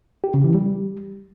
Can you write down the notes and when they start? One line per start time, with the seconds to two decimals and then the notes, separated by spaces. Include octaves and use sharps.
0.24 G4
0.34 C#3
0.44 E3
0.55 G3